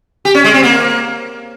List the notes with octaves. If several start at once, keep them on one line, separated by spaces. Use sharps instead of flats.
G4
C#4
G#3
C4
A#3